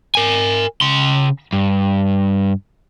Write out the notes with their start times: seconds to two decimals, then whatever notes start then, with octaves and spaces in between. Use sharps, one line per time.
0.15 A#4 G#5
0.81 C#3 C6
1.53 G2